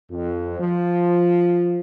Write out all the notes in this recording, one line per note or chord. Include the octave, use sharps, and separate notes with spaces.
F2
F3